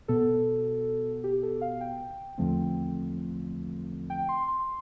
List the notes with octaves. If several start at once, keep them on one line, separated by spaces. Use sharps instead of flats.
B2 B3 A4
G4
A4
F5
G5
E2 D3 F3 A3 C4
G5
C6
C6